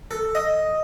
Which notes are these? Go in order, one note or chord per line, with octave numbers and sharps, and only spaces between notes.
A4
D#5